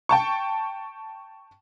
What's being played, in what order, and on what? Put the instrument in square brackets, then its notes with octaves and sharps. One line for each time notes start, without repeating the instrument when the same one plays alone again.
[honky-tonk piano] G5 A5 C#6